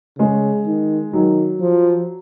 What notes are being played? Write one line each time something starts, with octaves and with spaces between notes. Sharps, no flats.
C#3 G#3
D#3
D#3 F#3
F3